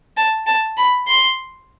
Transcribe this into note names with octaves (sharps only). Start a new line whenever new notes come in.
A5
A5
B5
C6